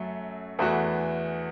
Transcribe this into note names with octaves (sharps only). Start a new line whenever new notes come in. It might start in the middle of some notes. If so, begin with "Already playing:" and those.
Already playing: F#2 F#3 A3 F#4
E2 E3 A3 F#4